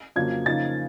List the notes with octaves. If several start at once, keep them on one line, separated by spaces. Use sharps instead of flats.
F2 C#3 F#3 A#3 G#6
C#3 F3 A#3 D#4 A6